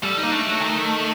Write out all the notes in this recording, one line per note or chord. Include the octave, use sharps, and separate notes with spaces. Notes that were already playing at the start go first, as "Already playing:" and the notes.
G3 A4
D#4
A#3
A3 D4
F#3
D#3